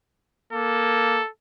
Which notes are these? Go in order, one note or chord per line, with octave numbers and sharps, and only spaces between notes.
A#3 A4